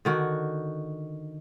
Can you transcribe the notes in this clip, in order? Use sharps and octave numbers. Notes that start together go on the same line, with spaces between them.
D3 D#3 F#4